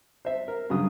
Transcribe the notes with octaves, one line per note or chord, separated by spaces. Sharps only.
C5 E5
A#4
G2 C#3 F#3 D#6